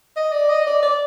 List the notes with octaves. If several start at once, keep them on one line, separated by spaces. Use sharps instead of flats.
D#5
D5
D#5
D5
D5